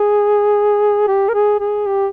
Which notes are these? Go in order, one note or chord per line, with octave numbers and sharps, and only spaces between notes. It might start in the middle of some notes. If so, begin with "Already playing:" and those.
Already playing: G#4
G4
A#4
G#4
G#4
G4